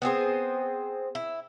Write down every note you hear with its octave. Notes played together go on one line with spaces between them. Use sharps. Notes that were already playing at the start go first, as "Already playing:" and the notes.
B3 C4 G#4 C5
E4